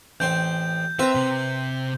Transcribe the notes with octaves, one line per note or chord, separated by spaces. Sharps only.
A1 C4 C5 G6
C4 B4 E5 A#5
C3